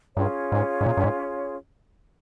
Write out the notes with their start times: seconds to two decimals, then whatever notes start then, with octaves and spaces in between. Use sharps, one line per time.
0.17 G2 C#4 F4 G#4 C#5
0.52 G#2
0.81 G#2
0.86 A#2
0.97 G2
1.04 G#2